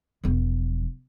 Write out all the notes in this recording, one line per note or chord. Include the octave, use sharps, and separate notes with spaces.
E1 F3